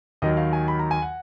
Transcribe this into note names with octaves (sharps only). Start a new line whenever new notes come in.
D#2 D#3 F#3 D#5
F5
G#5
B5
A#5
G#5
F#5